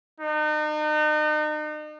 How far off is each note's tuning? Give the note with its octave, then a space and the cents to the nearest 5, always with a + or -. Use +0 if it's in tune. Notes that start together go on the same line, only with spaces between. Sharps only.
D#4 -40